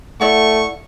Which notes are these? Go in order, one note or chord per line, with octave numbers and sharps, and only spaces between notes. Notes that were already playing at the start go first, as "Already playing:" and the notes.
A3 E4 D5 F#5 C#6